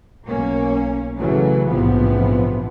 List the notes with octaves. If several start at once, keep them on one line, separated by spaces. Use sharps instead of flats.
B1 A#3 C#4
C#3 E3 F#3 A3
A#1 G#2 C3 E3 F3 B3